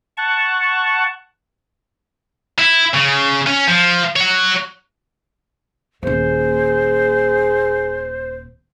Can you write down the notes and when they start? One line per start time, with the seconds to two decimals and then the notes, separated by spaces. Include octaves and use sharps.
0.17 F#5 A5 C#6
2.59 E4
2.94 C#3
3.47 C#4
3.67 F3
4.16 C#5 F#5
6.03 D#1 A#3 G#4 C5